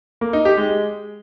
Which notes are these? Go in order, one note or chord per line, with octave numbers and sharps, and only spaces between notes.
A#3
D#4
G4
G#3